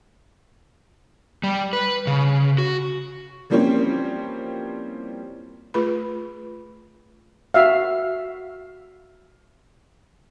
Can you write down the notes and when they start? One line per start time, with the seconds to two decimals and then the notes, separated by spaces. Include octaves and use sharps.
1.43 G3
1.73 B4
2.07 C#3
2.58 F#4
3.50 E3 F3 G3 A#3 C4 C#4
5.74 A3 F4 G#4 B4 B5
7.54 F#4 E5 F5